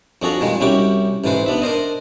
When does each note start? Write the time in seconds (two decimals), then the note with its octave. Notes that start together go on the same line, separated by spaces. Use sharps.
0.22 F2 D4 F#4 G#4 A4 A#5
0.41 A#2 D#3 G3 G#3
0.60 C2 C#4 E4 F#4 G4 D6
1.24 A1 G#2 E3 B4 C5
1.46 B3 D4 E5
1.62 D4 A#4 C5 D#5